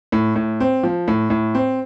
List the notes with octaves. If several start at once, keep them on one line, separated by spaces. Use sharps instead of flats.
A2
A2
C4
F3
A2
A2
C4